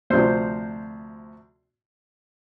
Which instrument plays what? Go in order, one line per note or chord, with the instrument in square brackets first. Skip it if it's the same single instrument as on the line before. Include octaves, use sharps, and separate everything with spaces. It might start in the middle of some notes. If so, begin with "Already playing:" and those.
[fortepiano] D2 C3 F3 C5